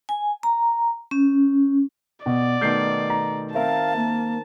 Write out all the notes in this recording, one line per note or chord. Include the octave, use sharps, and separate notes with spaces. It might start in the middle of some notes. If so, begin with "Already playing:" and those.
G#5
A#5
C#4
B2 D5
B2 D#3 A3 G6 C7
A#5
C4 A#4 C5 E5 F5 A5
A#3